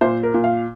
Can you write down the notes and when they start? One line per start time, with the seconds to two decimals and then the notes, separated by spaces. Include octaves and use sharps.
0.01 A#2 C5
0.23 A#4
0.34 A#2
0.44 F5